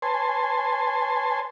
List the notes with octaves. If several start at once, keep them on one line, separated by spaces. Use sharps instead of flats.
B4 C#5 G#5 A5 C6